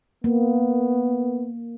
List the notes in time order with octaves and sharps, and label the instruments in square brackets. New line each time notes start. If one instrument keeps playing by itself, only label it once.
[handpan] A#3 [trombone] B3